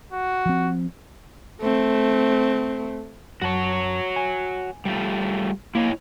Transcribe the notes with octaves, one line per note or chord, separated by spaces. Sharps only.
F#4
F3 C4
A3 C4
F#2 F#4 C#5 A5
G#5
G3 A3 F4
A#3 E4 C#5 D#5